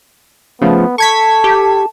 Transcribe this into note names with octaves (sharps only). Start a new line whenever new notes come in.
C#3 F3 A3 B3
A4 A5 C#6 G#6 B6
G4